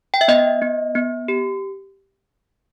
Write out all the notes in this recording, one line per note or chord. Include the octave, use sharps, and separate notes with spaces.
G5
E5
B3 D#5
B3
B3
G4